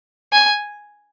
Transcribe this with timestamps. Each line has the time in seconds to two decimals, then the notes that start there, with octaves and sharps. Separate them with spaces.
0.32 G#5